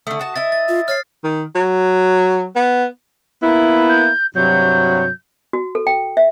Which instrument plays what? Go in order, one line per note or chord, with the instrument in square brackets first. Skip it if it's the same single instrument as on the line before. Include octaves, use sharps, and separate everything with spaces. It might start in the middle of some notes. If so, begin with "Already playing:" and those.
[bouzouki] D3 A3 [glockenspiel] D#6
[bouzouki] F#4 A5
[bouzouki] E4 D#5 E5 [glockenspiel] A6
[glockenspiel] A6
[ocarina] F4
[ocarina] C#5 [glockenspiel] F6 A6 C7
[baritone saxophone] D#3
F#3
B3
[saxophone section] A#3 B3 E4
[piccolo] G6
[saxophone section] G2 C3 F#3 [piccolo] G6
[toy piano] F#4
A4
G5
E5